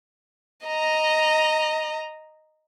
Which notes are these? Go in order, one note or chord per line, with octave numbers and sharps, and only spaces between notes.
D#5 A#5